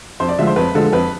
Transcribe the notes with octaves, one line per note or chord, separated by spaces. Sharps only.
F2 C5
D5
D3 F3 G#3 E5
C5
F2 B4
D3 F3 G#3 A4
F2 B4